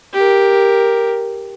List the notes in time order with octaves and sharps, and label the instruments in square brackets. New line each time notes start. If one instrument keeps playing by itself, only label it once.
[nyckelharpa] G4 A#4